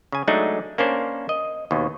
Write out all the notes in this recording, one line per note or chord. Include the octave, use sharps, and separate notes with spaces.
C#3 G#5
F#3 G#3 A3 D4 D#4
A#3 C#4 D4 C5
D#5
D#2 B2